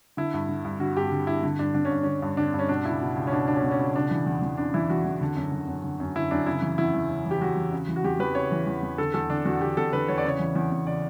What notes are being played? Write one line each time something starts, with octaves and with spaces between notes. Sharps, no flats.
D3 E4
G2
D3
G2
D3 F#4
G2 G4
D3
G2 E4
D3
G2 D4
D3 D4
C#4
G2
D3 C#4
G2
D3 D4
G2
C#4
B2 D4
C#2 E4
B2
C#2
C#4
B2 D4
C#2 D4
C#4
B2
C#4
C#2
C#3 D4
E3
E2
E2
C#3 D4
E3 E4
E2 F#4
E2
D3
F#2
D3
F#2
D3
F#2
D3 E4
F#2 D4
C#3 E4
E3
E2 E4
E2
C#3
E3
G4
E2 F#4
E2
C#3
E3
F#4
E2 G4
E2 B4
C#3 C#5
E3
E2
E2
D3 A4
E2 A4
D3 D4
E2 F#4
D3 G4
E2 A4
D3 B4
E2 C#5
D5
C#3 C#5
E3
E2
E2
C#3 D5